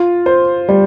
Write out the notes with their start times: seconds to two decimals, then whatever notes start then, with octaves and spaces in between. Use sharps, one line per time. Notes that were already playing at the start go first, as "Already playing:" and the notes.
Already playing: F4
0.26 C5
0.69 G3